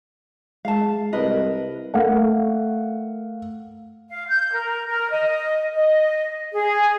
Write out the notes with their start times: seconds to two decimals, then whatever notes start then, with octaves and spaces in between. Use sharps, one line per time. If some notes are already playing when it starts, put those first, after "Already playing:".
0.65 G#3 F5 A5
1.13 C2 A#4 B4 D#5
1.94 A3 A#4 F5 F#5
4.10 F5
4.28 G6
4.53 A#4
4.87 A#4
5.11 D#5
5.74 D#5
6.52 G#4